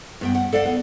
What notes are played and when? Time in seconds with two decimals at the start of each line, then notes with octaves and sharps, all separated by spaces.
0.21 G2 B3 G5
0.35 F#5
0.52 A4 D5 F5 F#5
0.66 B3